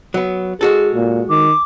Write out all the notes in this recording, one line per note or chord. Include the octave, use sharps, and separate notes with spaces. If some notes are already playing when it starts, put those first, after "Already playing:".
F#3 B3
G#3 F#4 G#4 A4
A#2
D#3 D6